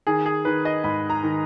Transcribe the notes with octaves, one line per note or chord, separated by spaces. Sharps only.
D#3 G#4
G#4
D#3 B4
D#5
G#2 B5
A#5
D#3